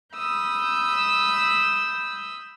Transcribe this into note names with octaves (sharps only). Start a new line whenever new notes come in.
B5 D#6 E6 G6